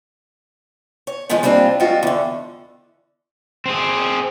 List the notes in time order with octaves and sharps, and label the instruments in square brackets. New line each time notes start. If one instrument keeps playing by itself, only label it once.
[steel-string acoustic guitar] C#5
D#3 F3 G#3 B3 C#4
G3 A#3 C4 D4 F4
F3 G3 G#3 C4 F4 F#4
E2 D3
[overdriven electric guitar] C4 G#4